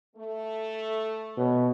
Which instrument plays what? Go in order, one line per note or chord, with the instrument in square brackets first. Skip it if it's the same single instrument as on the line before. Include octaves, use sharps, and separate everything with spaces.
[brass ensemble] A3
[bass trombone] B2 [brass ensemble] B4 C#5